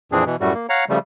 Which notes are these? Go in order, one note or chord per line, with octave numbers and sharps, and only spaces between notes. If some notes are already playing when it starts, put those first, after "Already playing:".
F2 A#2 E3 C4 D4 G#4
B2 E3
F#2 A2 G3 A3 F#4
A#3
C#5 F5 F#5 A#5
C#3 F3 G3 A3